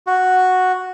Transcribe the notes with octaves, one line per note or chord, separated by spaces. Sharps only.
F#4